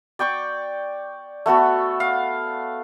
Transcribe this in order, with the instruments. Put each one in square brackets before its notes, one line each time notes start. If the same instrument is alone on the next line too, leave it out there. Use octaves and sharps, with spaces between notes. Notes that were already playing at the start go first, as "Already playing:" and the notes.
[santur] D5 G5 C#6 D6
A3 B3 F#4 A4
F5